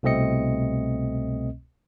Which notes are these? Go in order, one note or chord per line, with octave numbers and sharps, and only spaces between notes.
C2 B2 A3 C4 D#5 C#7